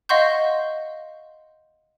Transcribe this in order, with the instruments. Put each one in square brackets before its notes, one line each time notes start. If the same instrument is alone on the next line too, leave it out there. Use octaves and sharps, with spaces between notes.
[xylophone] D#5 F5 F#5 C6 C#6 G6